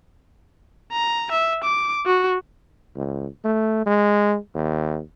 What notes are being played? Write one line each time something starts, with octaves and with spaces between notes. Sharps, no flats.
A#5
E5
D6
F#4
C#2
A3
G#3
D#2